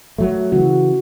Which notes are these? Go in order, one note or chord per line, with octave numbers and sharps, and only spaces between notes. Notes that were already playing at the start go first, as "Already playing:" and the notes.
F#3 A3
C#3 E3 F#4